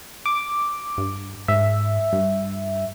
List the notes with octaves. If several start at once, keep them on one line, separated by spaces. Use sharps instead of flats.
D6
G2
G#2 E5
G2